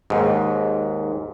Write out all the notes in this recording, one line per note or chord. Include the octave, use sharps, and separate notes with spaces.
D#2 G#2